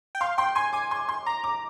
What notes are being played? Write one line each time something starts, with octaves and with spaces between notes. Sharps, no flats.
G5
F5 C6
G5 C6
G#5 C6
G#5 D6
C6
C6
A#5 D6
D6